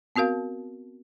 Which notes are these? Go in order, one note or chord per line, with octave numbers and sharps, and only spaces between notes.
B3 C4 F#4 A#4 F5